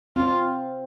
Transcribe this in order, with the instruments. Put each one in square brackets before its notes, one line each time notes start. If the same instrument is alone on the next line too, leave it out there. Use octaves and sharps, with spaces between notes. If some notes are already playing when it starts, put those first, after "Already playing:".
[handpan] C4 [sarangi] F4